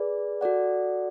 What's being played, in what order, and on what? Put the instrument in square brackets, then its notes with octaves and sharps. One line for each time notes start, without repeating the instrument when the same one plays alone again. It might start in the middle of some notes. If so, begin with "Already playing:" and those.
Already playing: [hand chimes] G#4 B4 D5
F#4 A4 D5 F#5